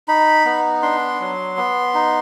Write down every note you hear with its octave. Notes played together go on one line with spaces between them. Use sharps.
D#4 B5
B3
D4 C6
F#3
B3
D#4